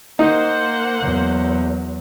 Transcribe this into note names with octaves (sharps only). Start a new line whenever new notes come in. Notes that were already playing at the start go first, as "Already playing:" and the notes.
A#3 D#4 C5 F#5
E2 F#3